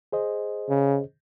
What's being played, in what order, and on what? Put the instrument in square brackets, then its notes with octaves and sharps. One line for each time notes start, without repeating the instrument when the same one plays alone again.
[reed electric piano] G#4 C5 D#5
[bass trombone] C#3